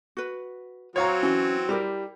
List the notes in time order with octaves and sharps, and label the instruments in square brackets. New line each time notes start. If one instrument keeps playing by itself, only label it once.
[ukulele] F#4 B4
[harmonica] F#3 C4 [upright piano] C#5 F5 A#5
[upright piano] E3 [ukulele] C#4 F#4
[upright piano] G3 [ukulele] E4 G4 A#4